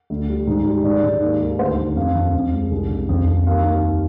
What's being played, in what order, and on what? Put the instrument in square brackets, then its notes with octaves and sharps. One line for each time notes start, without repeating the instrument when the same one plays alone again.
[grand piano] D2
G3
G#2
G3
G#2 D5
G#2
D#2
D#2
D2 C5
D2
F2 F5
F2
F2
G#3
C2
C2
F2
F2
D#2 F5
D#2